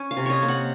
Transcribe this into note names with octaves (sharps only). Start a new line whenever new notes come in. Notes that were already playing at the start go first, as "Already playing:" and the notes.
Already playing: C#4
F5
C3
C#5 D#5
A#3
F#5